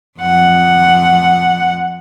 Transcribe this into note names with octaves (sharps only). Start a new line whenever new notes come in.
F2 F#5